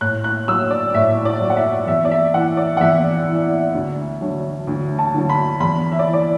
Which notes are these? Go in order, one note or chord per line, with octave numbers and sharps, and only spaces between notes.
A2 F#6
F#6
F#3 E6
D5
A2 E5
D5
F#3
F#5
E5
E2 E5
D5
E5
E3 F#5
D5
F#5
E2 E5
E3
D2
D3 F#3
D2
A5
D3 F#3
B5
E2 B5
E5
D5
E3
D5